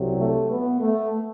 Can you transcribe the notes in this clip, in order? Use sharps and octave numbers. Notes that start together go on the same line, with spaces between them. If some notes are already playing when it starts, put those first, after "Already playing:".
Already playing: C2 C3 F#3
A3
B3
A3